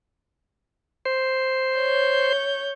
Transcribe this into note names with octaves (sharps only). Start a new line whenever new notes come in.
C5
C#5 G6